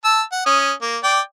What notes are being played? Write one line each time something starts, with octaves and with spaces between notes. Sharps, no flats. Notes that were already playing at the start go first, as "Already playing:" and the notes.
A5 E6
F#5
C#4 D#6
A#3
D5 G5